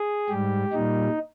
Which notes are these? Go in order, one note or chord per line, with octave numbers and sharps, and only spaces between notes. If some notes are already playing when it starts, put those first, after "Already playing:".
Already playing: G#4
G#2 G3 G4
A#2 G3 D#4